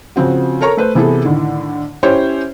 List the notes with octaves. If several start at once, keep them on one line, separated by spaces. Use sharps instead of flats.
C#3 F3 C4 F#4
A4 A#4 C#5 A#5 C#6
A3 B4 C5
C3 E3 B3 E4 G#4 A4
A2 D3 D#3
C#4 E4 G4 C5 C#5 E5